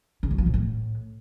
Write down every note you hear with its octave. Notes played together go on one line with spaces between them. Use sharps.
C#3
F#3
F3
A#2
A2